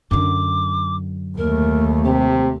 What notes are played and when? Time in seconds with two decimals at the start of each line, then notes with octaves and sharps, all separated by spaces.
0.11 F#2 D3 D6
1.38 D#2 A3 A#4
2.05 C3 G4